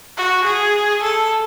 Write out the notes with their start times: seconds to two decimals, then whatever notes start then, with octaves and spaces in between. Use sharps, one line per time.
0.17 F#4
0.45 G#4
1.03 A4